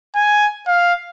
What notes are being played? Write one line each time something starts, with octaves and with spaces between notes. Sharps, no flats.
G#5
F5